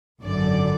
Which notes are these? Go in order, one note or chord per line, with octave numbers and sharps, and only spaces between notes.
G#1 F#2 D3 D5